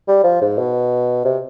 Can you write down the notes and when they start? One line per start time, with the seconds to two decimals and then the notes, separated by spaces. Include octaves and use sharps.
0.08 G3
0.24 F3
0.42 G#2
0.58 B2
1.25 C3